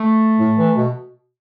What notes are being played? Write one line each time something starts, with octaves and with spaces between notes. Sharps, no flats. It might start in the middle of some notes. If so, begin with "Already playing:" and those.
Already playing: A3
A2
E3
B2